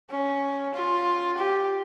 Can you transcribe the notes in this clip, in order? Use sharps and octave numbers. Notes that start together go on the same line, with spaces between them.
C#4
F4
G4